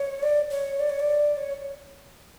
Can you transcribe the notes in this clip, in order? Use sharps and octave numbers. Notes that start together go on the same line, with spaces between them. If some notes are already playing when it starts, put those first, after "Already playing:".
Already playing: C#5
D5
C#5
D5
C#5
D5
C#5